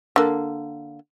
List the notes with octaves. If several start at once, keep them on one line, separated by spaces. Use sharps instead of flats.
D3 A#3